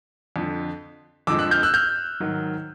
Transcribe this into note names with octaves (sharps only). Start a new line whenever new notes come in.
F2 D3 F3
F2 D3 F3 G#3 D6 E6
E6 F#6
F6 G6
E6 F#6
F6 G6
G#2 D#3 F#3